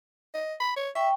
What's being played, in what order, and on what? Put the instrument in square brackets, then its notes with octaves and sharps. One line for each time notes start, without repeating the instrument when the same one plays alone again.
[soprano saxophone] D#5
B5
C#5
[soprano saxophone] E5 [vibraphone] G5 C#6